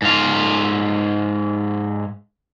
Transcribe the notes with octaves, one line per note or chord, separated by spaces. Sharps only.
G#2 F4